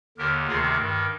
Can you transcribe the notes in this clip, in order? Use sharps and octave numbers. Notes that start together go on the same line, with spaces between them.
D#2 D3 G4 A#4
D2 C3 D#3 F4 G#4
G2 D#3